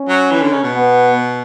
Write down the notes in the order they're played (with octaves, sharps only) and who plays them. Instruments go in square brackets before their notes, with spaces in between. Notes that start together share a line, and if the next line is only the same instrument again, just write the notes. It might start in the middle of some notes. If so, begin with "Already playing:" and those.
Already playing: [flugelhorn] C#4
[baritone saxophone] F#3
E3
D3
C#3
B2
[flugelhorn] B3